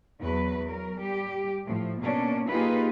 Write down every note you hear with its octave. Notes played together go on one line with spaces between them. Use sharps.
E2 F#3 B4
F#3 A#4
G3 G4
A2 F3
B2 A#3 C#4 D4
A#3 D#4 F4 G4 G#4 B4